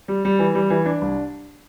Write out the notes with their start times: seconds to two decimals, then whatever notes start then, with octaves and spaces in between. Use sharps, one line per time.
0.08 G3
0.25 G3
0.39 E3
0.55 G3
0.70 E3
0.86 D4
1.01 C2